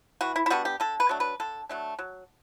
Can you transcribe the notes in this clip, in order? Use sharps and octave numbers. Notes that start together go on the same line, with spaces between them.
E3 F#4
E4
E4
G3 B3 D4 F#4
G4
D3 A4
B4
F#3 A3 D4
B4
D3 A4
F#3 A3 D4
F#3